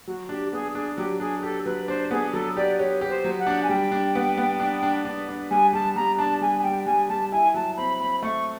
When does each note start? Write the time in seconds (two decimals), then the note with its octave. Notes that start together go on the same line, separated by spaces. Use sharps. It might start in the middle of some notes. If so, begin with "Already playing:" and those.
0.07 F#3 F#4
0.29 D4 G4
0.52 B3 G#4
0.75 D4 G#4
0.97 F#3 G4
1.20 D4 G#4
1.43 G4 A4
1.65 F#3 B4
1.88 D4 C5
2.11 B3 G#4
2.33 F#3 A4
2.57 G4 D5
2.79 G4 C#5
3.01 G4
3.09 C5
3.24 F#3
3.40 F#5
3.47 D4
3.63 G#5
3.69 G3 G5
3.92 D4
4.15 B3
4.37 B3
4.60 D4
4.83 D4
5.05 D4
5.29 D4
5.51 G3 G#5
5.73 G3 A5
5.96 G3 A#5
6.18 D4 A5
6.41 G3 G#5
6.59 G#5
6.63 G3 G5
6.86 G3 G#5
7.09 G3 A5
7.32 E4 G#5
7.54 F#3 A5
7.77 C4 B5
8.00 C4 B5
8.23 A3 C#6